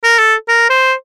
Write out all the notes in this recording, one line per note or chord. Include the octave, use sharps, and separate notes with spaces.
A#4
A4
A#4
C5